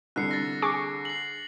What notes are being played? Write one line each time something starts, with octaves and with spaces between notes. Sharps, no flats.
C2 D3 F#6 C7 C#7
A6 A#6
G#4 C#6 D6
C7 F#7